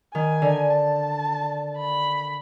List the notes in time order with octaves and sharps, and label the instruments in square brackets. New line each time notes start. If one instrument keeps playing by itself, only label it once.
[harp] D#3 [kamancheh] G#5
[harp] D3
[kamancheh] A5
B5